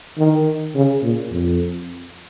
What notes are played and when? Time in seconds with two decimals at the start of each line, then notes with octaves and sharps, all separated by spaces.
0.18 D#3
0.75 C#3
1.03 A#2
1.32 F2